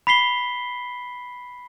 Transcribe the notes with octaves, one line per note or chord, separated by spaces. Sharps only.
B5 B6 C7 G7